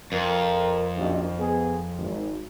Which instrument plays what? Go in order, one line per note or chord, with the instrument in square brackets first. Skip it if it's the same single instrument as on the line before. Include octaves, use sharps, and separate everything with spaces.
[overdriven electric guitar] F2 [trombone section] A#4
[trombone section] A#1 F#2 D#3
B3 G#4
G#1